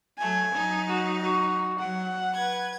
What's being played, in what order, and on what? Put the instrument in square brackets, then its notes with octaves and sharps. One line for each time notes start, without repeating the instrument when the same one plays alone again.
[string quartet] F#3 A3 [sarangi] G#5
[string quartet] F#3 D#4
[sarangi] F#4
F#4
[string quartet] F#3 [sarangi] F#5
[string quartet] B4 G#6